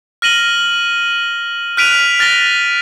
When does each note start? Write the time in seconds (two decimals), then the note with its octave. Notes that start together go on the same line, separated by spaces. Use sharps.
0.22 F6 A#6 D#7 F#7 G7
1.77 F6 F#6 B6 D7 D#7 F7
2.19 F6 A6 A#6 G7